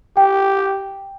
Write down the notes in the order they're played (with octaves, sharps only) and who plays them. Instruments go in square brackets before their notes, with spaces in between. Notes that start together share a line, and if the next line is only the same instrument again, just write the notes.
[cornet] G4 [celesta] G5